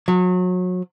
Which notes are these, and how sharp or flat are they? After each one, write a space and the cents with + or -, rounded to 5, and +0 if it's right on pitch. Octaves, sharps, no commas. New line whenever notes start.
F#3 -30